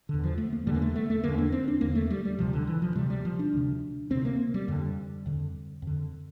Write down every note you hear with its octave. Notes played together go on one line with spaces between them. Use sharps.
E2 D3
F3
A3
A#3
E2 D3 G3
A#3
A3
A3
A3
E2 D3 A#3
D4
C4
D4
E2 D3 A#3
A3
G3
G3
D2 C3 F3
D3
E3
F3
D2 C3 G3
G3
F3
D4
D2 C3
D2 C3 C4
A#3
G3
F2 D3
F2 D3
F2 D3